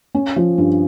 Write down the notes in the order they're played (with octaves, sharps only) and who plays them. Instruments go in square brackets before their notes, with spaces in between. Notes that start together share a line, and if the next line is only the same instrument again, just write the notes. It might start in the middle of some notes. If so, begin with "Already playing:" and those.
[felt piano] C#4
F3
G2